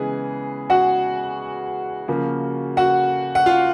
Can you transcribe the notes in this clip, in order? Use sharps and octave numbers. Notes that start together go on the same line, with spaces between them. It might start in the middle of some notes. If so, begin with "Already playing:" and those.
Already playing: C#3 E3 G#3 B3 G#4
F#4 F#5
C#3 F3 A#3
F#4 F#5
F#5
F4 F5